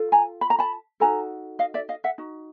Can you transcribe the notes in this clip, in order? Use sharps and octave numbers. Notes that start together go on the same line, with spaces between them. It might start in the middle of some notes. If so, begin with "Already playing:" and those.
Already playing: F4 A4
G#5 A#5
B5
A#5
A5 B5
D#4 F#4 A4 G#5 A#5
D#5 F5
D5 E5
D#5 F5
E5 F#5
D#4 F#4